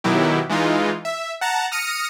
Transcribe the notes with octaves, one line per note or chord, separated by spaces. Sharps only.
B2 D#3 F#3 E4 G4
E3 G#3 D#4 F4
E5
F#5 A5 A#5
D#6 F6 A#6 C#7 D#7